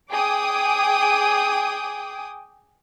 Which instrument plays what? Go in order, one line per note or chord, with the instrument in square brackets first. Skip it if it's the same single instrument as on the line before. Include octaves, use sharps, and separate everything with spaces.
[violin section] G#4 G5 G#5 D6 D#6